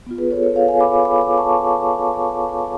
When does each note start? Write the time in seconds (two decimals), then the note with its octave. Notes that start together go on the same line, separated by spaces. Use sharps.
0.06 B3 F4
0.18 G#4 B4
0.31 A4 C#5
0.43 A4 C#5
0.56 C#5 F5
0.68 F5 G#5
0.80 B5 D6
1.05 B5 D6
1.21 B5 D6
1.38 A5 C#6